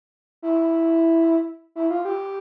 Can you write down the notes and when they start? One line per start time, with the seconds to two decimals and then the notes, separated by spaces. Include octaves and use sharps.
0.42 E4
1.76 E4
1.90 F4
2.05 G4